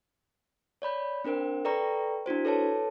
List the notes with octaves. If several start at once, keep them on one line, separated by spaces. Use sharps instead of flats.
C#5 D5 B5 G6
C4 D4 A#4 C5 G5
A4 B4 D5 G5 A#5 C#6
D4 E4 F#4 C5
A4 B4 C#5 A5